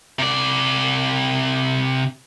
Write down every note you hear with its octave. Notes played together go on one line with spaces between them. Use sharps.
C3 D5